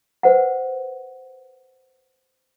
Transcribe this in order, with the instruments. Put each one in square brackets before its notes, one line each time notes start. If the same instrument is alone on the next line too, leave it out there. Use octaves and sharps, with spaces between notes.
[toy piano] B4 C5 F#5